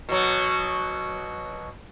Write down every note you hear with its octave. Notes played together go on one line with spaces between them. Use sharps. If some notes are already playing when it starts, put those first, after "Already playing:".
B2 F#3